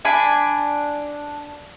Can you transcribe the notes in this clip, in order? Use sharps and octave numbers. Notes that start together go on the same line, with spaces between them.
D4 G#5 B5